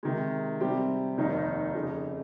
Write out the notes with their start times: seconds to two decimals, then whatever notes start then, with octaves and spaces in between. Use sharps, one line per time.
0.03 C3 D#3 G#3
0.60 C3 G3 C4 G4
1.17 F1 D#2 D#3 A#3 D#4
1.74 F1 F2 C#3